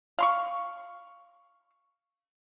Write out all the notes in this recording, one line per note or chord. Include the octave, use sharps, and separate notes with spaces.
F5 C6 C#6